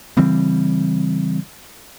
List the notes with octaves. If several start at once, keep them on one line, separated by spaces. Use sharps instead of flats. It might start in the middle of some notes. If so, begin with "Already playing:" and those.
C#3 E3 G3 C4